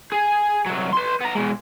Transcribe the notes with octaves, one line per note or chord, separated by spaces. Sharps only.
G#4
C2 F#3
B4 C6
B3 A#5
B2 G#3